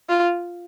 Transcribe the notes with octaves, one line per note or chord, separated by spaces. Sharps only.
F4